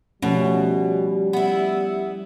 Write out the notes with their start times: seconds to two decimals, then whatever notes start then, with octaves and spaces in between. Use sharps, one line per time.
0.22 B2 F3 G3 A3 C#4
1.33 B3 E4